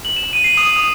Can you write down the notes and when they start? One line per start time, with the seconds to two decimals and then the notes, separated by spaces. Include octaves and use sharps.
0.05 F#7
0.16 E7
0.33 D#7
0.44 C7
0.57 D#6
0.76 D#6